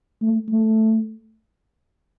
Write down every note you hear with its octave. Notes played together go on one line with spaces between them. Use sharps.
A3
A3